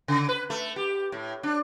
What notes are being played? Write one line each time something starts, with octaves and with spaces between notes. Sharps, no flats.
C#3
B4
A3
G4
A2
D4